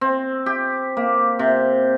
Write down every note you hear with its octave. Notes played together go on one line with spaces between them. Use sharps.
C4
G4
A#3
C3